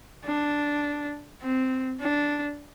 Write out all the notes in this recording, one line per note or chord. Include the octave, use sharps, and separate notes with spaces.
D4
C4
D4